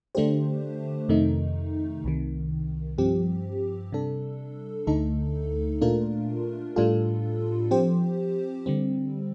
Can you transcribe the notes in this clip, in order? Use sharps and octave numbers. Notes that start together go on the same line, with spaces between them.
D3 A3 D4 G4 C5
F2 C3 D#3 A3 D#4
C2 C3 D#3
G2 F3 C4 G4
C3 G3 D4 A4
D2 D3 A3 D#4 A4
A#2 A3 D4 F4 A#4
A2 G3 D4 F4 A4
F3 C4 G4 C5
D3 G3 C4